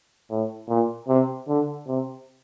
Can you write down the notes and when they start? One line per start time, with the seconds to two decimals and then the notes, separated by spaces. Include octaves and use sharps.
0.30 A2
0.69 A#2
1.08 C3
1.48 D3
1.87 C3